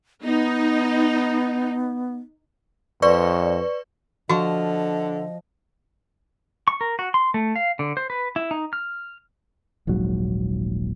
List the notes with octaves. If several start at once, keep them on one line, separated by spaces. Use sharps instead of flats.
B3 D#4
F2 B4 D5 C#6
D3 F3 F#4 D#5 C#6
C#6
A#4
F#4
C6
A3
F5
D3
C5
B4
E4
D#4
F6
D#1 A#1 G#2 F#3